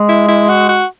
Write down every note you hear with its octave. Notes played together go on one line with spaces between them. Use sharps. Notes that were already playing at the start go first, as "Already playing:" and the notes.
Already playing: G#3
E4
E4
F#4
F#4